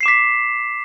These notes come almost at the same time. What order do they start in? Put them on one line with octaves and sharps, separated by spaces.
C7 E7 D6 B6